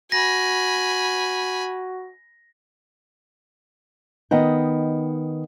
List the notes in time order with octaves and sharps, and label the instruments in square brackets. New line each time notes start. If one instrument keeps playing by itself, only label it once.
[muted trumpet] F#4 [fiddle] G#5 B5 [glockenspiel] A#6
[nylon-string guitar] D#3 B3 D#5 F#5 G5